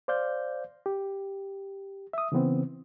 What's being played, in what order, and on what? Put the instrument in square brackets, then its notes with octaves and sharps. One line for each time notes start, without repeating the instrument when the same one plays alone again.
[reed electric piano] C5 D5 F5 G6
G4
E5 D#6
C#3 E3 B3 C4